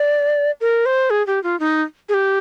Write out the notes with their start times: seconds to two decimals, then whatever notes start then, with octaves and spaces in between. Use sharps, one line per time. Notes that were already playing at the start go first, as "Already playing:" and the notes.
Already playing: D5
0.61 A#4
0.86 C5
1.10 G#4
1.27 G4
1.44 F4
1.60 D#4
2.09 G#4
2.14 G4